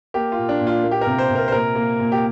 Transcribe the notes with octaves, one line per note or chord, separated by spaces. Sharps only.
A#3 G4
F4
A#2
D4
A#2
F4
A#3
G4
A#4
C3
C5
C3
A#4
C5
A#2 A#4
A#3
A#2
G4